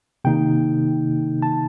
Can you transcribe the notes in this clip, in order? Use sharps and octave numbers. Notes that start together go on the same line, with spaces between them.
C3 D#3 A#3 D#4 G5
A5